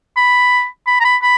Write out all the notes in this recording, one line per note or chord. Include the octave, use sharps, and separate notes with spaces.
B5
B5
A#5
B5
B5